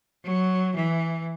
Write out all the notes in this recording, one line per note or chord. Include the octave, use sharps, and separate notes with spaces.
F#3
E3